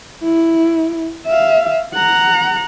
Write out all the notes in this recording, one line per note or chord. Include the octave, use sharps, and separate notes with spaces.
E4
E5 F5
F#5 A#5